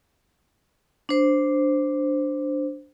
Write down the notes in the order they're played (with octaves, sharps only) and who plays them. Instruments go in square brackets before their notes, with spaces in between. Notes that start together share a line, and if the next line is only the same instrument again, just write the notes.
[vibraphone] D4 C5